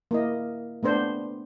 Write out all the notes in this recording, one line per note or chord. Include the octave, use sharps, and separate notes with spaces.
A#3 E4 D#5
A3 B3 D4 C5